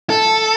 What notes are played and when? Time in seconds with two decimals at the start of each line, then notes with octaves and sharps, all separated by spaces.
0.10 A4